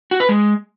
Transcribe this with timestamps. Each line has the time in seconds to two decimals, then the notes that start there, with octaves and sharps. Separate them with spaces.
0.11 F#4
0.20 B4
0.29 G#3